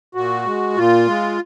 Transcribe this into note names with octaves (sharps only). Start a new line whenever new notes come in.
A#2 F#4
G#3
A#2 F4
G#3